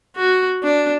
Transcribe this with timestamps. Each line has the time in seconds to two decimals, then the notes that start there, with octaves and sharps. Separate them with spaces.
0.16 F#4
0.63 D4